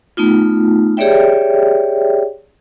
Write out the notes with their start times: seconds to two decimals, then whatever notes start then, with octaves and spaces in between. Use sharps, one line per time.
0.17 A3 B3 D#4 F4
0.97 G4 G#4 C#5 D5 E5 G5